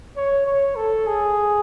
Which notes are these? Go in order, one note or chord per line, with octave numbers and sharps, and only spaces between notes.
C#5
C#5
A4
G#4